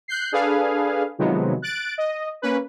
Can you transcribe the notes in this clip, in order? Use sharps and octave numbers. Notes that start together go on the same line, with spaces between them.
F#6 G6 C7
D4 G#4 A4 B4 F5 G#5
C3 D#3 F3 F#3 G#3 B3
F#6 A6 D7
D#5
A#3 C#4 B4